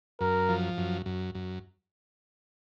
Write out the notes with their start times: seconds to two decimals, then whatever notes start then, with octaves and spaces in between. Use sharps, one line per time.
0.21 F#2 A#4
0.49 F3
0.78 F#2
1.06 F#2
1.35 F#2